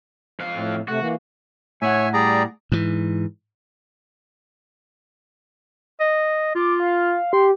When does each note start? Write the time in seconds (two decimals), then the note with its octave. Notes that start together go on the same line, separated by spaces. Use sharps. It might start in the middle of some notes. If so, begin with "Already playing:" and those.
0.40 F2 F5
0.55 A2
0.88 C3 A3 F#4
1.00 E3 A#3
1.82 A2 C#5 E5 F#5 G#5
2.14 G3 G#4 D5 A#5
2.72 G#2 E3
6.00 D#5
6.55 F4 D6
6.80 F5
7.33 G4 C6